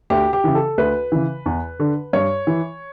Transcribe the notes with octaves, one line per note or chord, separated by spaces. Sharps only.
D2 G4
G4
C#3 E3
A4
D2 B4
C#3 E3
E2
D3
G2 C#5
E3